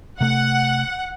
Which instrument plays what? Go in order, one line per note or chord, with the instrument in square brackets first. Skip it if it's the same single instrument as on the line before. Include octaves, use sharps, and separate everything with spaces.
[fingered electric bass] C3 A3 [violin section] F#5